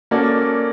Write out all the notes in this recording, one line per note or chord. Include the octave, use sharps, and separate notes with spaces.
A#3 C#4 F#4 A4 D5